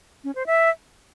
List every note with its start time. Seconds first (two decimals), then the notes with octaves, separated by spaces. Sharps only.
0.24 C#4
0.35 C5
0.46 E5